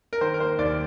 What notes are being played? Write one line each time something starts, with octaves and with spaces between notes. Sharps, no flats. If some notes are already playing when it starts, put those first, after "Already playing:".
A#4
D#3 C5
A#4
A#3 C5
D#2 D5